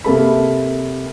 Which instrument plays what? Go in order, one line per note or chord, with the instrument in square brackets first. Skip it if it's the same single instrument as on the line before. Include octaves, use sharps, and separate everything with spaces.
[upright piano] C3 A#3 A4 B5